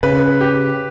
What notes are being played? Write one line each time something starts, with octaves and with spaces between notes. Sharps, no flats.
C#3 B4
G4